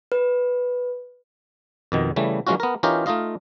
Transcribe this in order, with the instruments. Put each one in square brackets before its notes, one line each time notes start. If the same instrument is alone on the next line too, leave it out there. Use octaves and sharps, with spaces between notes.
[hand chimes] B4
[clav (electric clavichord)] F2 B2 D#3
C#3 E3 G3 A3
E3 F#3 G#3 C#4 F4 F#4
B3 A#4
E3 C#4 D#4 F4 G4 A#4
A3 D#4 F4 D#5 F5